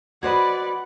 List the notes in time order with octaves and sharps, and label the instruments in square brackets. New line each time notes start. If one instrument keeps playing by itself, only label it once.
[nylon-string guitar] F#4 C5 D#5 [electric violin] B4 D5 [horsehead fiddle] F#5 [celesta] B5 G#6